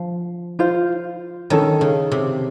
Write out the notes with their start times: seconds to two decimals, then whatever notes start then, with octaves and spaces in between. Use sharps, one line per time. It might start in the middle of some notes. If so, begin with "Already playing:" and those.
Already playing: F3
0.59 F4 C5 F5
1.50 D#3 C#4 A4 C#5
1.81 C#3
2.11 C3